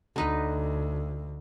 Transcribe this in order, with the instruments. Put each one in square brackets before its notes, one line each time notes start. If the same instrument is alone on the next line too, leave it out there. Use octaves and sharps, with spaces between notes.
[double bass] D2 [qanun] D3 D#4 B4